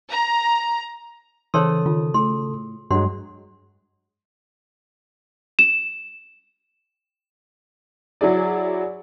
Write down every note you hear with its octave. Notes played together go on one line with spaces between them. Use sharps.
A#5
C#3 E3 A4 C5 C#5 C6 D#6
D#3 F4
A2 G#4 C6
G2 F#3 G#3 D4 F#5 C6
E7
F#3 E4 G#4 D5